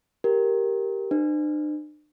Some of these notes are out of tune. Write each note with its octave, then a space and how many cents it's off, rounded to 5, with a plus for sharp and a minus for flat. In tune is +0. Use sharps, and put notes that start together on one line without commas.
G4 +0 A#4 +0
D4 +45 C5 -40